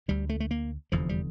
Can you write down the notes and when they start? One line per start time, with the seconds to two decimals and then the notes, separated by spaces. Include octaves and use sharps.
0.08 D2 D3 G3
0.29 A3
0.40 A3
0.51 A#3
0.92 F1 E2 D3 F3
1.09 G3